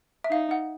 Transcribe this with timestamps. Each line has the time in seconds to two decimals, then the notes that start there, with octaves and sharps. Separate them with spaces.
0.24 E5
0.31 D#4 F5
0.51 F#5